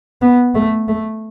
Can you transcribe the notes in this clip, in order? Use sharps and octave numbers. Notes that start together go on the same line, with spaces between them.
B3
A3
A3